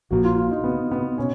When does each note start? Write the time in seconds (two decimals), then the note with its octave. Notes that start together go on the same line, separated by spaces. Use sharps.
0.11 A#1 A#2 F3 A#3 F#4
0.24 F4
0.38 F4
0.51 D#4
0.64 B3
0.91 B3
1.18 B2 C#4